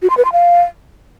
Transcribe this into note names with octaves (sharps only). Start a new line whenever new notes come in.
F#4
C6
B4
C6
F5